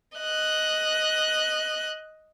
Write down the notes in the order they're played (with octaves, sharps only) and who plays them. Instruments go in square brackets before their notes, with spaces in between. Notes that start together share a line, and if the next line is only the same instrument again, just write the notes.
[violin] D#5 F#6